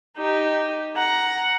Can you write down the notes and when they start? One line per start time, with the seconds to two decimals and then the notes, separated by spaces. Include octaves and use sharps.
0.17 D#4 G4
0.97 F#5 A#5